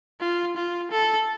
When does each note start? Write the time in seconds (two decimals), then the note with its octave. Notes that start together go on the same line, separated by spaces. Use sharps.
0.20 F4
0.56 F4
0.91 A4